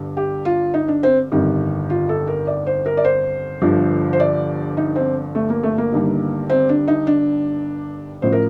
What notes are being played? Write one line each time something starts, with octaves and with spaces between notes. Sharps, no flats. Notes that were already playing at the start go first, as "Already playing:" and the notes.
Already playing: G1 G2
G4
F4
D#4
D4
C4
G1 F2 D#3 G3
F4
A4
A#4
D5
C5
A#4
D5
C5
G1 G2 D3 F3
C5
D5
D#4
C4
A3
A#3
A3
A#3
G1 G2 D#3 G3
C4
D4
D#4
D4
A1 A2 F3 C5
A#4